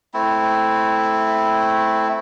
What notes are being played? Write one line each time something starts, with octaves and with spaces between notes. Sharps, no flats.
A3 C4 E4